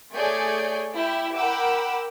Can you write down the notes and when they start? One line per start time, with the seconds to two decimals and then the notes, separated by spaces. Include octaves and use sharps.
0.13 A3 G#4 C#5 D5 G#5 G6
0.93 E4 G4 E5
1.34 A#4 F#5 G5 B5 D6 E6